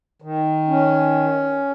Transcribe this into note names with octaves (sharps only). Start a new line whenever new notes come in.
D#3
C#4